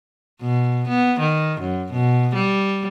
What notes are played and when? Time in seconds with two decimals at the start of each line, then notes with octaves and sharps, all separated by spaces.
0.41 B2
0.88 B3
1.20 D#3
1.61 F#2
1.92 B2
2.34 G3